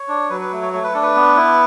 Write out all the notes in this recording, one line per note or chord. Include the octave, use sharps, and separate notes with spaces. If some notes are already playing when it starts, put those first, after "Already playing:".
Already playing: C#5
D4
F#3 B4
B4
A3
C#5
A3 C#5
B4
D4 A4
B4
B3
E4